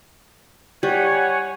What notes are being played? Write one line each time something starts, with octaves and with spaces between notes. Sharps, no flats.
G3 C#5 F#5 G#5